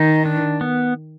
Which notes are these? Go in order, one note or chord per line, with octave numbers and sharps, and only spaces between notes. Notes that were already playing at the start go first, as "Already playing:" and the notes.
Already playing: D#3 D#4
D4
B3